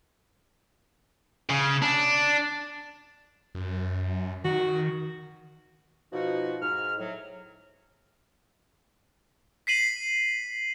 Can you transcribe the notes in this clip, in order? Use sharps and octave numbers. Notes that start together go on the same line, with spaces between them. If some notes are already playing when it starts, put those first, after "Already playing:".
C#3
D4
F#2
D#3 F#4
B2 F3 D#4 F#4
G#2 F6
A2 F#3
B6 C7 D#7 F#7